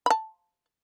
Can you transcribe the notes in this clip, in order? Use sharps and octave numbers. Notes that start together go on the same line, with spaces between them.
A5 B5